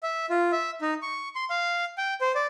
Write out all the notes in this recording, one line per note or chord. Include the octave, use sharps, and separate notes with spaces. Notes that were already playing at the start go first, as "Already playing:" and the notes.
E5
F4
E5
D#4
C#6
C6
F5
G5
C5
D5